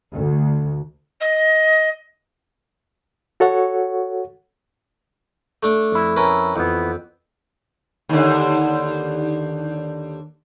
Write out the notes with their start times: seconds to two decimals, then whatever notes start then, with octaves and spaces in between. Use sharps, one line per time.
0.14 D2
1.20 D#5
3.40 F#4 A4 C#5 F#5
5.63 A3 D4 D6
5.92 F2 E4
6.16 C#4 A#4 B4
6.56 F2 E3 B3
8.09 D#2 D3